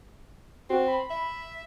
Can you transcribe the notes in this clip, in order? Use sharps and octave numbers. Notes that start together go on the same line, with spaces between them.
C4 F#4
B5
E5